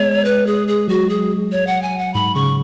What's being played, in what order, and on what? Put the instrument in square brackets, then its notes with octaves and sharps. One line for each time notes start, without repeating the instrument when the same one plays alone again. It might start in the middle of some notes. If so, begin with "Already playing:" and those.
Already playing: [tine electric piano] G#3 B3 [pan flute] C#5
[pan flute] B4
G#4
G#4
[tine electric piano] F#3 [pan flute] F#4
[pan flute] G#4
C#5
F#5
G#5
F#5
[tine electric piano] G#2 [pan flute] B5
[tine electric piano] C#3 [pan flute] C#6